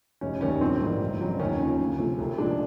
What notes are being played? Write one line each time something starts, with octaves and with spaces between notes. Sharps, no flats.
F1 C#4
D#2 D#3 G3 C#4
A#1 C4
G#2 E3 G3 A#3
F1
F2 C#3 F#3
D#2 C#4
C#3 F3
D2
C3 F3 A3
C2
A#2 F3 G#3 D4